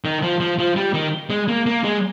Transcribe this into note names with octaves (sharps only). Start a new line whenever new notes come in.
D#3
F3
F3
F3
G3
D#3
G#3
A#3
A#3
G#3